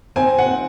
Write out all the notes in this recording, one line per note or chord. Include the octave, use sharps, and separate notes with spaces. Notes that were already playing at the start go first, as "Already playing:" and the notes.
C4 G#5
F#5
C4